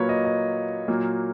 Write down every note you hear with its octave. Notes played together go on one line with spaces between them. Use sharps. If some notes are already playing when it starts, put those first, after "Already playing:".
Already playing: A#2 F#3 A#3 B4 C#5
D#5
D#5
A#2 F#3 A#3